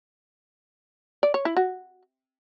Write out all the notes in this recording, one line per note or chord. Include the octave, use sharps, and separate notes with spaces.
D5
C#5
E4
F#4